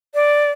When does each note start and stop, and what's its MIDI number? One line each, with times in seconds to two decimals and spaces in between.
0.14 0.51 74